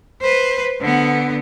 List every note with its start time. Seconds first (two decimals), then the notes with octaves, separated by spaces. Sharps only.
0.21 B4 C5
0.81 D3 B3